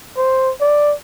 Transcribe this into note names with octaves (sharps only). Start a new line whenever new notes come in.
C5
D5